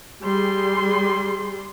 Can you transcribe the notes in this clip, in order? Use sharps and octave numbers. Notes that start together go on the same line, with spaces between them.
G3 G#4 C6